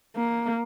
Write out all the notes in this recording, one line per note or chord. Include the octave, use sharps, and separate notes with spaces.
A#3